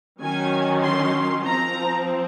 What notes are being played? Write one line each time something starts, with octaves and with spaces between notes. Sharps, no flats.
D#3 F#3 C#4 G#5
C6
F3 C4 A#5